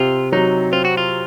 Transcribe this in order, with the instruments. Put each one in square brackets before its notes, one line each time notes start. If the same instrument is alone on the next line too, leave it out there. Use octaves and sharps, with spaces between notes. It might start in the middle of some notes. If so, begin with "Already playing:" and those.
Already playing: [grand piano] C3 [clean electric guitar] F4
[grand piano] F#3 [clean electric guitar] D#4
[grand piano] C4 [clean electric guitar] F4
[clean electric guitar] F#4
F4